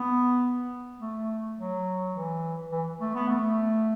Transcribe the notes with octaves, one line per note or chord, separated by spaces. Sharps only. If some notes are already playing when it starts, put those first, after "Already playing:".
Already playing: B3
A3
F#3
E3
E3
A3
B3
A3